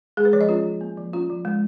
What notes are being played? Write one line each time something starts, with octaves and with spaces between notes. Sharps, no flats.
G#3 G#4
B4
F3 C#5
D#5
C#4 F4
F3
A#3
F3
C#4 F4
F3
G#3